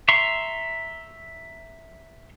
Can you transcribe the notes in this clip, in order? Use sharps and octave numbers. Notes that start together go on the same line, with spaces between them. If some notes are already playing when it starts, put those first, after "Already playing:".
E5 A#5 C6 C#6